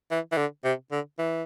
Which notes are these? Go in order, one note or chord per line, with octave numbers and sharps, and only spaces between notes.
E3
E3
D3
C3
D3
E3